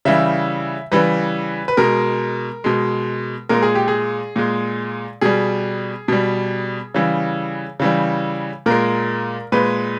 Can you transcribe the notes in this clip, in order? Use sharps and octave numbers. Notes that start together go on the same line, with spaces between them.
C#3 E3 G3 E5
C#3 E3 G3 B4
B4
B2 G#3 A#4
B2 G#3
A#2 G#3 A#4
G#4
G4
G#4
A#2 G#3
B2 G3 G#4
B2 G3
C#3 E3 G3
C#3 E3 G3
A#2 G#3 A#4
A#2 G#3 B4